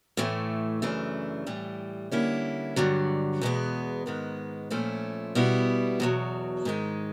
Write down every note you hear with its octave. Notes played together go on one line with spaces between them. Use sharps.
A2 E3 A3
F#2 C#3 E3 A3 D4
A2 E3 G3
D3 G3 A#3 C#4 E4
G2 D3 F#3
E2 B2 G#3 B3
G#2 D#3 G#3 B3
A#2 F3 A3 C#4 E4
B2 G3 B3 E4
E2 B2 F#3
G#2 D#3 G#3